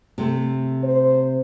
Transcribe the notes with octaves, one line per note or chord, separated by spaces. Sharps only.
C3 A3
C5